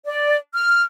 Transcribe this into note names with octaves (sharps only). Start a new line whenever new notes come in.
D5
F6